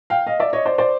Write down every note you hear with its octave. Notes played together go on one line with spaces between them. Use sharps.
F5 G5
D#5 F5
D5 E5
C#5 D#5
C5 D5
C5 D5